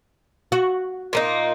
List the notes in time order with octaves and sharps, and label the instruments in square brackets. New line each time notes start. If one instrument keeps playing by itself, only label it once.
[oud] F#4
[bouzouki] A#2 A#3 D#4